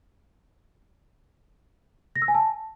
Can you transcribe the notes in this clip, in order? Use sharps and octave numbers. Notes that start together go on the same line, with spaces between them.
A#6
E6
G#5
A5